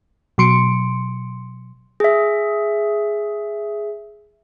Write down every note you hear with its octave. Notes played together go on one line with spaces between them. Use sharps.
B2 F#3 C6 C#7 D7
G#4 E5